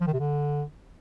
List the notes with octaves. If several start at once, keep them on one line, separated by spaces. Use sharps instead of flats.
F3
D#3
C3
D3